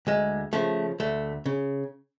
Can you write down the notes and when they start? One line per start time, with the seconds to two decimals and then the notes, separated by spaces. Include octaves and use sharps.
0.07 D2 G#3
0.53 C#3 F3 A3
1.00 D2 A3
1.46 C#3